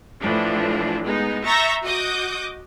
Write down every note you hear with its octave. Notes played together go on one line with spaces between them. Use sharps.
A2 E3 F3 D4
G#3 B3 D#4
E5 A#5 C#6 G6 A6 A#6
F#4 D#5 D6 D#6 G6